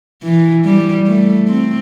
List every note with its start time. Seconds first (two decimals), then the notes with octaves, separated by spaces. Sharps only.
0.23 E3
0.65 G3
1.06 A3
1.48 C4